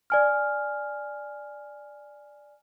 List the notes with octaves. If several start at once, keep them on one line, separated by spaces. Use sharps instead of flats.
D5 G#5 F6